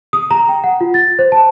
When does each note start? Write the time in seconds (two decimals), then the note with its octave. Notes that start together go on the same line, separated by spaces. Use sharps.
0.13 D#6
0.31 A#5
0.49 G5
0.64 F#5
0.81 F4
0.94 A6
1.19 C5
1.32 A5